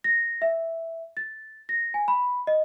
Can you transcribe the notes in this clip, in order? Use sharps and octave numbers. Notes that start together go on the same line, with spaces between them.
A#6
E5
A6
A#6
G#5
B5
D#5